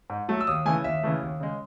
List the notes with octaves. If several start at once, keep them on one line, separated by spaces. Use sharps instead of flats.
G#2
F#3 A3
E6
D#2 D#6
C#3 E3 A3 G#5
D#2 E5
C#3 E3 A3
D#2
C#3 G#3